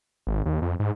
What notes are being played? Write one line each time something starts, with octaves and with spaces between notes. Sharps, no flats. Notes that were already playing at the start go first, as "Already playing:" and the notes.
G#1
D#2
F2
G#2